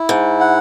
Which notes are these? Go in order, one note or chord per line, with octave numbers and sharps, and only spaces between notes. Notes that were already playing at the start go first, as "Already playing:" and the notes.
Already playing: E4
G#2
F#5